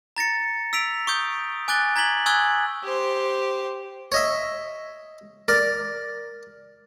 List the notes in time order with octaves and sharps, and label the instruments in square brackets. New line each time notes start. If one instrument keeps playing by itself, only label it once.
[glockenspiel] A#5 A6 A#6 C#7
E6 B6 D7 F7
C#6 D#6 G6
G#5 D6 F#6 G6 A6 G7
A#5 G#6 B6 F#7 G7
G#5 C#6 D#6 E6 F#6 G#6
[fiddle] G4 C5
[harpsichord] C#5 D#5 E5
A#4 D5